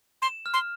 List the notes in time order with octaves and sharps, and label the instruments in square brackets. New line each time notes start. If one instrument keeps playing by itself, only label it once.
[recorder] C6 [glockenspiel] E7
[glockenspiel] F6
[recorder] C6